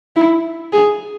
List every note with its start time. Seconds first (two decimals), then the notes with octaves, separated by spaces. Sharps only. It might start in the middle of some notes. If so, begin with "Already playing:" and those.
0.16 E4
0.73 G#4